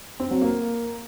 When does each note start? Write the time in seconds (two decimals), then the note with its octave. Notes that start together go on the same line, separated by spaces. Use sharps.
0.20 C4
0.31 F#3
0.42 A#3